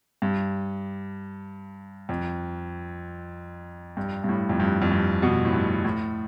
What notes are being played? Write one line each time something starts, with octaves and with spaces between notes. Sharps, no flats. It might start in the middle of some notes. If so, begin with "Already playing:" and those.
G2
F2
G2
G2
A2
F2
G2
F2
G2
B2
A2
G2
A2